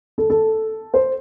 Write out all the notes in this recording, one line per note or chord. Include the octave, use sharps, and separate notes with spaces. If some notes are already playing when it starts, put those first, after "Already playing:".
A4
A4
C5